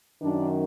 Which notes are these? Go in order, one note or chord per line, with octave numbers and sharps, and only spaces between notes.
F#2 D#3 D4